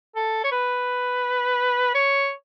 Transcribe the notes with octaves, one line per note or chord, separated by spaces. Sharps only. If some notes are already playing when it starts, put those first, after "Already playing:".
A4
C#5
B4
C#5